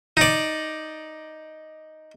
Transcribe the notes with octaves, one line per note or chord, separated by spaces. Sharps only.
D#4 D5